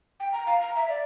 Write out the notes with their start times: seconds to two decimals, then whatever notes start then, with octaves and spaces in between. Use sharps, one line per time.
0.20 G5
0.32 A#5
0.47 F5
0.61 A#5
0.76 E5
0.89 D5